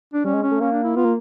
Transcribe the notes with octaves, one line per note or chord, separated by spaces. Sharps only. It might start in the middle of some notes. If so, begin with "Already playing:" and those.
D4
G3 C#4
G#3
C#4
A3
A#3 C#4
D4
E4
B3 F4
A#3